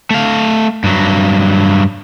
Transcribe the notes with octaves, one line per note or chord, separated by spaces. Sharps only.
A3 F5
G2 F#3